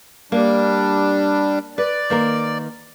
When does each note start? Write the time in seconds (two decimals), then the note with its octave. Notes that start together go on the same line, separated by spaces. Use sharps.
0.32 G3 A#3 D4
1.78 B4 D5
2.10 D#3 A#3 A#4